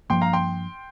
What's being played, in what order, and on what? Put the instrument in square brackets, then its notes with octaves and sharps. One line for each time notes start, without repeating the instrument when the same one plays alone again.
[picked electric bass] G2 F3 A#3 [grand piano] G5 C6
[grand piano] F5 A#5
G5 C6